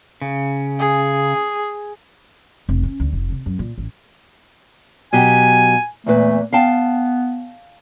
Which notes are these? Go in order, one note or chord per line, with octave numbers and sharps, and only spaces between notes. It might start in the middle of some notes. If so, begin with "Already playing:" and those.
C#3
G#4
F1
C#4
D2
F1
C3
F#2
A#2
A1
B2 F#3 G4 G#5
E2 A#2 A3 B4
B3 F5 G5 A5